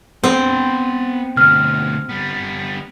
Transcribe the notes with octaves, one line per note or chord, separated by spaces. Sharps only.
B3 C4 G5
D2 B2 F6
G3 B3